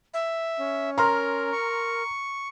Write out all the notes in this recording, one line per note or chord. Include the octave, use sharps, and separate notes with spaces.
E5
C#4
A#4 A#5 C6 F6
C#6